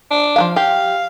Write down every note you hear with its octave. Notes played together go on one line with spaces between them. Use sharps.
D4
F3 F#3 F5
G4 F5